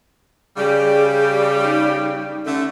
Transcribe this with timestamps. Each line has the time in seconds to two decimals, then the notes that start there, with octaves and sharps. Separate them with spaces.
0.57 C#3 G3 G#4
1.64 D#4
2.46 D3 A3 C#4